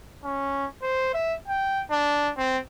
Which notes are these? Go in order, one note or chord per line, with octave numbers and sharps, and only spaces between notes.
C#4
C5
E5
G5
D4
C4